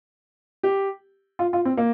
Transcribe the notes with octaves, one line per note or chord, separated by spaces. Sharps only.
G4
F4
F4
C4
A#3